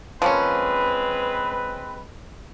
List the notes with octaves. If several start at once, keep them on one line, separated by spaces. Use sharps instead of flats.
F3 G#3 A#3 C4 C#4 B4